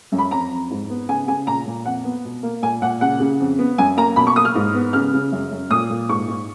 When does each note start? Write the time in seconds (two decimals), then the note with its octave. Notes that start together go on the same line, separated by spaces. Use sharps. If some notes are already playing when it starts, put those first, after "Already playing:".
0.12 F#2
0.18 B5
0.31 F2 A#5
0.51 F2
0.70 G#2
0.90 B3
1.09 C#3 G#5
1.27 C#3 G#5
1.47 A#2 A#5
1.67 A#2
1.85 F2 F#5
2.05 B3
2.25 B2
2.43 A#3
2.62 A#2 G#5
2.82 A#2 F#5
3.01 C#3 F#5
3.20 C#3
3.40 F2
3.59 B3
3.78 F#2 G#5
3.97 A#3 A#5
4.16 B2 B5
4.27 C#6
4.36 A#3 D#6
4.45 F6
4.55 G#2
4.75 B3
4.93 C#3 F6
5.13 C#3
5.32 F#2
5.52 F#2
5.70 A#2 D#6
5.90 A#2
6.09 G#2 C#6
6.28 G#2